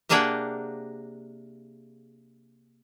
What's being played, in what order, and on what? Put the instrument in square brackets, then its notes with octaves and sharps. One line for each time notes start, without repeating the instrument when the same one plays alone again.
[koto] C3 A#3 D4 G#4 F#5 G5